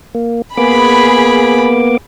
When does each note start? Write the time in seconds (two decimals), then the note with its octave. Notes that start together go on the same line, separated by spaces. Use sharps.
0.15 A#3
0.57 A#3 B3 G#4 B5 D6